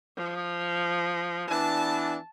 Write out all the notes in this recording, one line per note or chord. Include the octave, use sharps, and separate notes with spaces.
F3
E3 B3 D4 A5